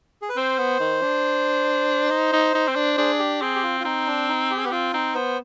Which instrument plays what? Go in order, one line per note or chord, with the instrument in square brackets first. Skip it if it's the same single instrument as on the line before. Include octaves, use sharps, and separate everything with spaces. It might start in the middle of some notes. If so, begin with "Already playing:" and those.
[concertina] G#4
B4
[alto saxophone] C4 [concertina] C5
[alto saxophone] B3
D#3
D4
D#4
D#4
D#4
C4
D4
[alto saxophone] D4 [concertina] G#4
[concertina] G4
[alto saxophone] C4 [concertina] G#4
[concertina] G4
F4
F4
[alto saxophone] C4 [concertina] D#4
[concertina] D4
D#4
G4
G#4
[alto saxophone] B3 [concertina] G4
[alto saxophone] C4 [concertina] F4
[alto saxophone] C4 [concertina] D#4
[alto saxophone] B3 [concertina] C5